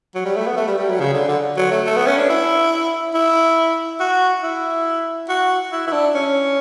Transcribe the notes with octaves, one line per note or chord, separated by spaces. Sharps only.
F#3
G3
A3
B3
A3
G3
G3
F#3
C#3
D3
D3
F#3
A3
A3
B3
C#4
D4
E4
E4
F#4
E4
F#4
E4
E4
D4
C#4